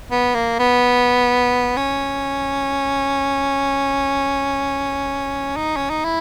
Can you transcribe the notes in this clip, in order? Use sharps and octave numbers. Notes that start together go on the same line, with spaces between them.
B3
A#3
B3
C#4
D#4
C#4
D#4
E4